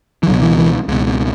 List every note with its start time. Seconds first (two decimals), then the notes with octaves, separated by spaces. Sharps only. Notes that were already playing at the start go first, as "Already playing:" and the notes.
0.23 E3
0.27 C#2 B2 F#3
0.42 E3
0.58 E3
0.88 C#2 B2